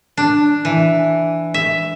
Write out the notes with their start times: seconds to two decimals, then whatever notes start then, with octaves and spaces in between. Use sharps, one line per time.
0.17 D4
0.65 E3
1.54 E5